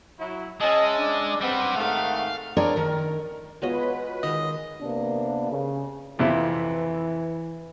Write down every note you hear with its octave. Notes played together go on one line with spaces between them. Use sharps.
F#3 E4
G#3 C#4 D#5 E5 A5
D4
G3 C4 B4 F#5
G#2 D#3 A3 F5
C4 D4 G#4 A#4 C#5 D5
D#3 A#4
G#3 B3 F4 F#4 B4 C#5 D#5
D#3 G#3 D#5
C3 A#3 B3 D4
C#3
F2 C3 E3 E4